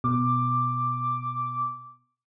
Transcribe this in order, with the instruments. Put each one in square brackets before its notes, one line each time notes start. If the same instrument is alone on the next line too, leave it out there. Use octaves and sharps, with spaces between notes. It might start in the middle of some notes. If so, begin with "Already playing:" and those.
[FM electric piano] B2 [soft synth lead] D6